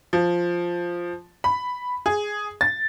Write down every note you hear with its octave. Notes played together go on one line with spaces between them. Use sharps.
F3
B5
G#4
A6